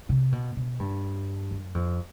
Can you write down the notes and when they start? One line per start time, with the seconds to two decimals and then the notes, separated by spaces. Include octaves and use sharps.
0.09 C3
0.32 B2
0.56 B2
0.79 G2
1.51 F#2
1.74 F2